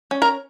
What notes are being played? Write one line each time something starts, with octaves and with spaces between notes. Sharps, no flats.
C#4
A#4 A#5